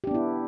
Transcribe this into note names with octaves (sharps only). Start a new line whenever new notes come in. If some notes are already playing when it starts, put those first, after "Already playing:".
B3 D4 E4 G4